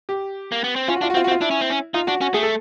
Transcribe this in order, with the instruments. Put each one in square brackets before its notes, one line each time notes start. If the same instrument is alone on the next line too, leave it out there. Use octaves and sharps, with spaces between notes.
[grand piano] G4
[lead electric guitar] A#3
B3
C4
[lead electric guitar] C#4 [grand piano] F4
[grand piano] F#4
[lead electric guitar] D4 [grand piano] F4
[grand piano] F#4
[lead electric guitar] C4 [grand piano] F4
[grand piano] F#4
[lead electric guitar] C4
[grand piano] F4
[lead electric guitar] D4 [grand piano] E4
[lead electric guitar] C#4
C4
C#4
[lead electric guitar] D#4 [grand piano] F4
[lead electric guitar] D4 [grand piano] F#4
[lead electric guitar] C#4 [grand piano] F#4
[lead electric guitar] A3 [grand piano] G#4
[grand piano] A4